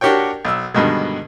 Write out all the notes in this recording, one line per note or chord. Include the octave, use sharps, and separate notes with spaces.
D4 F#4 G4 A#4 C#5 G5
B1 E6
G2 B2 D3 D#3 G#3